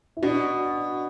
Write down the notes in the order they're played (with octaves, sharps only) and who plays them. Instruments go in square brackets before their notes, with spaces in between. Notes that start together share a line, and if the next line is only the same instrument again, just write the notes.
[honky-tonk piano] E4
[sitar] B2 [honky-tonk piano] D4 F#4